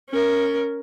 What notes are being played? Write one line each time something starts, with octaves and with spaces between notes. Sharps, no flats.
C#4 A#4